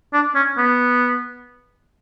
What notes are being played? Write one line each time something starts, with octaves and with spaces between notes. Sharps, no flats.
D4
C#4
B3